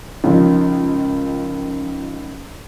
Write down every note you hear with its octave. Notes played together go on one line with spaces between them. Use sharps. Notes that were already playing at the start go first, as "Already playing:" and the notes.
C#2 D#3 F3